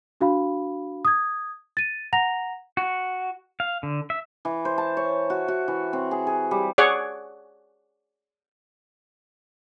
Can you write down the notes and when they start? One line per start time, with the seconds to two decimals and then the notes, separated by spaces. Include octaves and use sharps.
0.21 D4 F#4 F5 B5
1.05 D#6 G#6
1.77 A6 D#7
2.13 F#5 A#5 A#6 F7
2.77 F#4
3.60 F5
3.83 D3
4.10 E5
4.45 E3
4.65 C5
4.78 A5
4.97 C#5
5.30 F#4
5.48 F#4
5.68 E3
5.93 C4
6.11 G#4
6.27 G#4
6.51 G3
6.78 G#4 C#5 D5 F#5